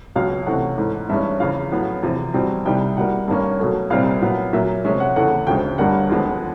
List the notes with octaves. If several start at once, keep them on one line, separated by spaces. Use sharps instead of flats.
C#2 B2 F#3 F5
C3 E3 A3 C#4 F#5
G#2 E3 A3
G2 E3 G#3 C#4 E5
E2 C#3 F3 F5
A2 F#3 B3
E2 C3 F3
E2 B2 G3 C4
C2 C3 D#3 G3 G5
B2 G3 A#3 F#5
G2 D#3 G3 A#3 C#4
B2 F#3 A3
C2 A#2 G3 C4 F5
A#2 F#3 B3
A#2 F#3 A#3 E5
C3 F3 G#3 C#4 E5
F#5
E2 C#3 E3 A3 F#5
D2 C#3 F3 G#3 G5
G2 D3 G3 A#3 C#4 F#5
D#2 D3 F3 G#3 B3